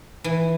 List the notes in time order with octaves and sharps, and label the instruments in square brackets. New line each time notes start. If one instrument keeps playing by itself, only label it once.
[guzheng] E3